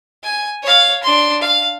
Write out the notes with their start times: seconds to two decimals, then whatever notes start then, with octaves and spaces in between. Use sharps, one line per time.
0.23 G#5
0.63 C#5 F5
1.03 D4 C6
1.41 F5